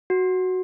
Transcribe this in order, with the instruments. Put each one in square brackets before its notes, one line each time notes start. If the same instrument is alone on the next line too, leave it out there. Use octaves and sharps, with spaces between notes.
[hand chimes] F#4